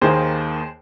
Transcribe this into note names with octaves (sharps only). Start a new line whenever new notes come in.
D#2 D#3 A#3 G#4 C5